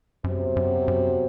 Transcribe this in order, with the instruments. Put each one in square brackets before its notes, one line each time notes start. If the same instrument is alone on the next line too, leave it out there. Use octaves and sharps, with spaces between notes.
[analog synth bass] F#2 [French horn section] C3 F#3 B3 F#4 C5
[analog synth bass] F#2
F#2